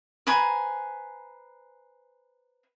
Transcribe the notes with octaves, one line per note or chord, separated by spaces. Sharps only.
B4 C5 G#5 A#5